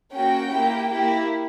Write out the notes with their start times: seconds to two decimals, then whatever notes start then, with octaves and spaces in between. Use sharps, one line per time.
0.12 A#3 C#4 F#4 G5
0.52 A#3 E4 G4
0.90 A#3 E4 G4